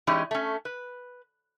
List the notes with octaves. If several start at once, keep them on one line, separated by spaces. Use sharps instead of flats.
E3 G#3 C#4 D#4 G4 D5
A3 C#4
B4